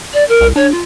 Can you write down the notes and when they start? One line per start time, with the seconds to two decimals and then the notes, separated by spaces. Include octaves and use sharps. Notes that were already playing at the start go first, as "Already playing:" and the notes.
0.13 D5
0.29 A#4
0.41 C2
0.56 D4 C#5
0.72 F4